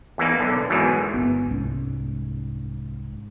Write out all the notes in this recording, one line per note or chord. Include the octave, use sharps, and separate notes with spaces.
E2 E3 A#3 D#4
B1 D3
E2 G#2 B2 D#3 E3 F#3
G1 D#2 B3
C2 G#2 C#4